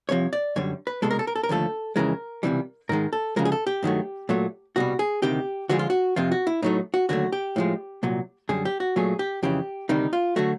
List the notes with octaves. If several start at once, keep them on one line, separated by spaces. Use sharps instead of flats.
C2 C3 F3 C#5
D5
F#2 D3 G3 C#5
B4
C2 B2 G#3 A4
A#4
A4
A#4
A4
A#4
D#2 D3 F3 A3 A4
F2 C#3 E3 G#3 A#4
C#2 C3 E3 G3
G#2 D#3 G#3 A#4
A4
D2 C#3 F3 G#3 A#4
G#4
A4
G4
G2 D#3 F#3 A3
A#2 F#3 A3
C2 B2 G3 F#4
G#4
D2 C3 D#3 G4
D2 D3 F3 G#3 F#4
F4
F#4
F2 C3 F3 F4
F#4
E4
A2 F#3 A3 D#4
F#4
D#2 D3 F#3 A3 F#4
G4
A2 F3 G#3
C2 A#2 F#3
F#2 D3 G3 G#4
G4
F#4
A#2 F#3 A3 G#4
G4
F2 C#3 E3 G4
D2 C3 D#3 G3 D#4
F4
D3 F#3 A3 F#4